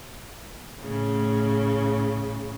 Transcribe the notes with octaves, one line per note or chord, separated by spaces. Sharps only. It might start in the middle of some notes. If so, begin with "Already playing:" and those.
A2 C#3